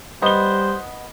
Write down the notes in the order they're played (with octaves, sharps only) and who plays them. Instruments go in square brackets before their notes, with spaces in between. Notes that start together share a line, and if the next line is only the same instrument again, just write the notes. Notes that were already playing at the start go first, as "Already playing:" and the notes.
[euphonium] G3 [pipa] B3 [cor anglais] C5 [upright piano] D#5 G7